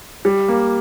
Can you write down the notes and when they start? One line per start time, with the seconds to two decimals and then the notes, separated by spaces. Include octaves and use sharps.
0.25 G3
0.48 A#3